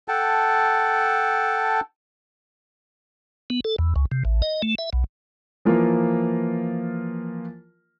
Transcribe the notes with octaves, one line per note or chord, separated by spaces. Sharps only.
A4 F#5 G5 A5
B3
A4
E2
C#2
C3
A1
D#5
A3
E5
B1
E3 F3 A#3 F4 A#4